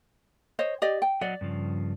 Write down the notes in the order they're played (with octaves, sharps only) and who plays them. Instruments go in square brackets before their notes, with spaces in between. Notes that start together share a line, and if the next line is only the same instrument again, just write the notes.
[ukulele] C5 C#5 D#5
G4 D5 D#5
G5
[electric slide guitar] F#3 D#5 F#5 [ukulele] D5
[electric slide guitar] G2 C#3 F3